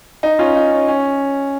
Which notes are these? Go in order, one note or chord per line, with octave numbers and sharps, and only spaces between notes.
D#4
C#4 F4
D#4
C#4
C#4